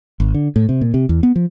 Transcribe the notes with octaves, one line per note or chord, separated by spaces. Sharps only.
G#1
D3
A2
C3
A#2
C3
E2
B3
F3